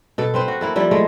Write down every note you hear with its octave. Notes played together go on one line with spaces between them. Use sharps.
B2 A4
C4 B4 C5
F#4
A#3 E4 A4
F3 G3 E4
G#3 A3